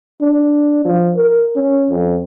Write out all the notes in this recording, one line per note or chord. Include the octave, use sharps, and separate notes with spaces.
D4
F3
A#4
C#4
F2